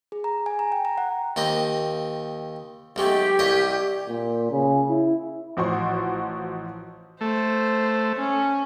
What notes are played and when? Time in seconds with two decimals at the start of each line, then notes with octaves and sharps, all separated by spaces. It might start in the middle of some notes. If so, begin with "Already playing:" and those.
0.12 G#4
0.24 A#5
0.46 G#5
0.59 A#5
0.72 G5
0.85 A#5
0.98 F#5
1.36 D#2 C4 D#5
2.96 B1 G#3 A3 G4
3.39 C2 C#5 D#5
4.09 A#2
4.51 C#3
4.90 E4
5.57 A1 F3 F#4 C6 C#6
7.21 A3 C5
8.16 C#4